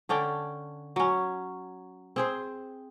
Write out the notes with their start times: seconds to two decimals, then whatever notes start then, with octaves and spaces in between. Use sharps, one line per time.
0.09 D3 C#4 D4 G5
0.96 F#3 C#4
2.16 C4 G#4 C5